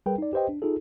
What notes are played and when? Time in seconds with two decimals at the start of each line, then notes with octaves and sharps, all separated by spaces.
0.06 G3 G#4 A#4 B4 G5
0.18 D#4 D5
0.33 G4 B4 C5 D#5 G5
0.49 D4
0.62 D#4 F4 G#4 A4